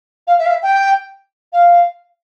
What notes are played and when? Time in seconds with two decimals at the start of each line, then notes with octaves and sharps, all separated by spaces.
0.27 F5
0.39 E5
0.45 F5
0.50 E5
0.62 G5
1.52 F5